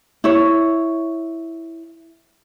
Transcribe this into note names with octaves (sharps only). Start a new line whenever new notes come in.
E4 C#5